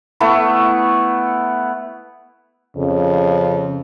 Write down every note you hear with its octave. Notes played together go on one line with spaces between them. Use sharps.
A3 B3 E4
F2 C#3